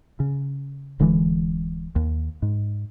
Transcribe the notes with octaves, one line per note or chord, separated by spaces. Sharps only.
C#3
D1 D3 E3 G#3
D#2
G#2